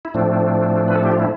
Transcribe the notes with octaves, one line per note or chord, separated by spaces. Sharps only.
E4
A2 F3 A3 C4 D4
B4
A4
G4
F4
E4